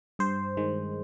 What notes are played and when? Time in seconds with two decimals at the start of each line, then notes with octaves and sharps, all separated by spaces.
0.19 G2 C5
0.57 D#3 G#3